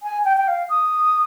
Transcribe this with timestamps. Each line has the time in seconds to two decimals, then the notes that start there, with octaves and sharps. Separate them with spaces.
0.03 G#5
0.25 G5
0.37 G5
0.48 F5
0.70 D#6